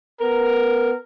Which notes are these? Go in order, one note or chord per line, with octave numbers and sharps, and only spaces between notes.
B3 A#4